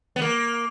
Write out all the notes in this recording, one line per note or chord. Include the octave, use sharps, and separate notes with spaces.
B3
A#3